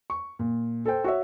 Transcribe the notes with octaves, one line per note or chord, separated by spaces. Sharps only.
C#6
A#2
A4 C5 G5
F#4 C#5 E5